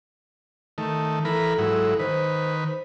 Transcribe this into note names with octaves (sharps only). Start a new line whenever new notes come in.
D#3 A3
E3 A4 A#4 B5
G#2 F#3 E4
D#3 B4 C5